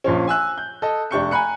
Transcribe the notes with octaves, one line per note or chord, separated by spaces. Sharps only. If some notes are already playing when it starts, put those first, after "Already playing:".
A#1 A#2 F3 C#4
G#5 E6 F#6
G6
A4 D#5
F1 D4 G4 C#6 G6 C#7
G#5 A#5 B5 F#6 C#7